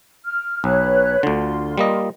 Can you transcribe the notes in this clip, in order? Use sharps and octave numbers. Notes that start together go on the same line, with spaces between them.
F6
B1 B4 C#5 F#6
D2 D3 F4 C6
G3 A#3 D#5